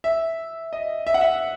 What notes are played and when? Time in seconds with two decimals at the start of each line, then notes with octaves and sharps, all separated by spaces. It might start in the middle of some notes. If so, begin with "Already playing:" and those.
0.04 E5
0.73 D#5
1.07 E5
1.14 F#5
1.21 E5